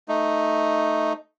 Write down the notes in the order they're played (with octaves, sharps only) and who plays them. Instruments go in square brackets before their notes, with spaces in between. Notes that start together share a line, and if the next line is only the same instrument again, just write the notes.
[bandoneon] A3 D#4